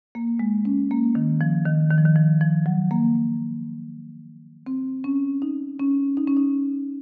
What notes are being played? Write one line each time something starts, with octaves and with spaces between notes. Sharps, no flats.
A#3
G#3
C#4
A#3
D#3
F3
D#3
D#3
F3
D#3
F3
F3
F#3
A#3
C4
C#4
D#4
C#4
D#4
C#4
D#4